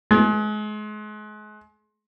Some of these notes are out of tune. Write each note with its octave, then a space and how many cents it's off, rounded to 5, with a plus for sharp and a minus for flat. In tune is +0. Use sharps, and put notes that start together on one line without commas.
G#3 +35